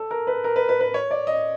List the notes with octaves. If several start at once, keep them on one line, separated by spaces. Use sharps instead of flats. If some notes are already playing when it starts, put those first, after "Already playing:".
Already playing: A4
A#4
B4
A#4
B4
B4
B4
C#5
D5
D#5